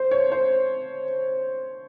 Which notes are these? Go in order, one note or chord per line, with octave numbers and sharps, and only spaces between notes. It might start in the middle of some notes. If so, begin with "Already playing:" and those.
Already playing: C5
C#5
C5